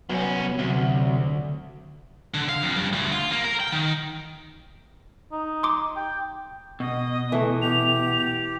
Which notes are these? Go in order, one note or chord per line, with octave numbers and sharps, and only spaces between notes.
C2 F#3 B3 C#4
D2 C3 F#3
D3
F5
F2
G2
D2
F4
A#3
A#4
G5
D#3
D#4
C6 D6
G5
B2 D#5
E3 A3
G4 F7